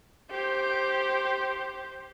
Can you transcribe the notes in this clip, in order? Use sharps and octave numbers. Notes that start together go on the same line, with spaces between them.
G4 C5